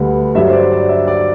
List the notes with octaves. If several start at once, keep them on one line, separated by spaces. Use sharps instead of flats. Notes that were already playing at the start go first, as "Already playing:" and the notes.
Already playing: D2 D3 G3 B4
G2 F#3 E5
C5
D5
D5
E5
D5